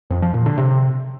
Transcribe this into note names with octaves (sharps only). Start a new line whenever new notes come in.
F2
F3
A#2
D3
C3